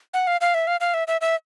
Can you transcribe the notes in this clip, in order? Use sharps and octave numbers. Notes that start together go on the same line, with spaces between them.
F#5
F5
F5
E5
F5
F5
E5
E5
E5